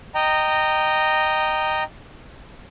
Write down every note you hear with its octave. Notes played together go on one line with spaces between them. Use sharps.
D#5 G5 A#5